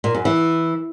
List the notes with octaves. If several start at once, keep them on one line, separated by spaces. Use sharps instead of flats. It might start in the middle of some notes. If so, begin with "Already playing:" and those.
A#2
F#2
E3